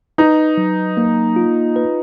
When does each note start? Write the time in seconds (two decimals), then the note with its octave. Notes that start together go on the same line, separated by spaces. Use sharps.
0.18 D#4 B4
0.57 F#3
0.97 A#3
1.36 F4
1.76 B4